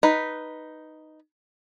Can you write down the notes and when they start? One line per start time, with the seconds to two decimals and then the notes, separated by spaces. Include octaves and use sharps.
0.03 D#4 B4